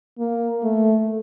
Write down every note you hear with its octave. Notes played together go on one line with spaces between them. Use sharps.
A#3
A3